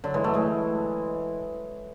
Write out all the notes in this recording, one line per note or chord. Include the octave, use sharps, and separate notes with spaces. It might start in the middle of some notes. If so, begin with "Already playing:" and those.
D3 F#3
E3 G#3
F#3 A3
E3 G#3